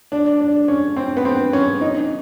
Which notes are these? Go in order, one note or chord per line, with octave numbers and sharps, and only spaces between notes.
D4
D4
C#4
C4
B3
C4
C#4
D#4